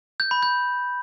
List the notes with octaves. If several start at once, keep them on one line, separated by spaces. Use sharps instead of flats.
G6
B5
G6